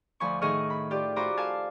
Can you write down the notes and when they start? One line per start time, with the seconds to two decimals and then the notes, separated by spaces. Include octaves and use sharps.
0.20 D2 D3 F3 G#5 B5 C#6
0.41 A2 D#3 G#4 D#5 C#6 F6
0.70 B5
0.91 F4 G4 D5
1.16 F4 F#4 C5 A#5 B5 D6
1.37 A4 F5 G#5 A5